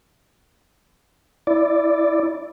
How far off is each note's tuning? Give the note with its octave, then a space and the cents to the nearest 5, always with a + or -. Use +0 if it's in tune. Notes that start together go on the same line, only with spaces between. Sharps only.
E4 +0 D5 +0